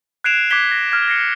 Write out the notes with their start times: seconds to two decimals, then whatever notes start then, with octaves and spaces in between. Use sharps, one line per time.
0.24 F#6 G#6 C7 D7 E7 F7
0.51 D6 F#6 G#6 B6 G7
0.71 A#6
0.92 D6 F6 G#6
1.08 A#6 C7 C#7